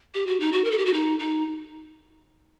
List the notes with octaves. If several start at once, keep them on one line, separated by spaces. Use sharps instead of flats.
G4
F#4
D#4
F#4
A#4
A4
G4
F#4
D#4
D#4